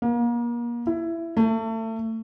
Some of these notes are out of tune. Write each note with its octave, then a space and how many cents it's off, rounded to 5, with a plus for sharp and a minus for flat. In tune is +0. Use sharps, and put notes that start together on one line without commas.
A#3 +35
E4 +15
A3 +30